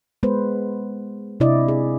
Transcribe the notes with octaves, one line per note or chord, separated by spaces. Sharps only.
G#3 B3 B4 C5
C3 D4 E4 D5 D#5
G#4